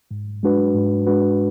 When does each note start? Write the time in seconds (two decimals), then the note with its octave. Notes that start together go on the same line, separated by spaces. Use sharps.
0.11 G#2
0.43 G#3 D4 F#4 B4
0.74 G#2
1.07 G#3 D4 F#4 B4